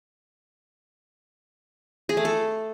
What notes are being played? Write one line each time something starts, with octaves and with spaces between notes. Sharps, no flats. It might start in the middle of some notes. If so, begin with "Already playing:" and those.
G#4
A3
A4